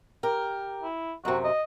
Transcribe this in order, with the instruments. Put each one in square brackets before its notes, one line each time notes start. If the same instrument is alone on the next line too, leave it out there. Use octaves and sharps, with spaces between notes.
[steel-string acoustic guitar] G4 A#4
[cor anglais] E4
[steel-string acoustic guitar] F#2 C3 [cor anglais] F#4
[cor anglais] D#5